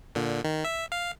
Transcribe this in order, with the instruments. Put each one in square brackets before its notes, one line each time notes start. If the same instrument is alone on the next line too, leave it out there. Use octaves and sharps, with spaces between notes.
[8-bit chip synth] A#2 D3
D#3
E5
F5